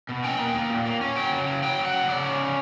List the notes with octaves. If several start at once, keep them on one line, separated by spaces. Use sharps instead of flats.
B2
C#4 G5
A#3
A#3
A#2
A#3
C#4
F#3 G5
C#3
F#3
F#3 G5
F#3
F#5
C#3
C#3 D5
C#4
C#3